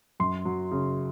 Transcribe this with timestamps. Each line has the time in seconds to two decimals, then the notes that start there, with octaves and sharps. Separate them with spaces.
0.20 F#2 C6
0.45 F#3
0.72 C#3